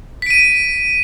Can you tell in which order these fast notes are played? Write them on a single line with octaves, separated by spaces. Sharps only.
B6 D7 D#7